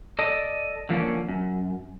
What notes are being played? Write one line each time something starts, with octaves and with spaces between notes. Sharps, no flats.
A4 D5 D#5
D3 F3 A#3 C#4
F#2